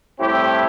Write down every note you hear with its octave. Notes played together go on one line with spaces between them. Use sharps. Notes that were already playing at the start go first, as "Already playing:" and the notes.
A2 G3 C4 E4 G4